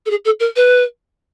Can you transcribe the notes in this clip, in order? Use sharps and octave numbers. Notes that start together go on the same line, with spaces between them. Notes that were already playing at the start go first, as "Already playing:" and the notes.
A4
G#4
A4
A#4
B4